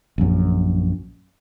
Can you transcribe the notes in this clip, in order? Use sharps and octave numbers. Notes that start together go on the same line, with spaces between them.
A#1 F#2